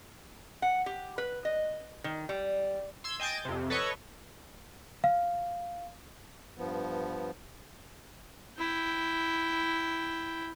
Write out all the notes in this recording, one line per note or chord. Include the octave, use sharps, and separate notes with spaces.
F#5
G4
B4
D#5
D#3
G3
C6 E6 G#6
D#5 G5 G#5 G6 A6
F2 C3
A4 B4 C#5 D#5 C#6
F5
G2 F3 B3
E4 G5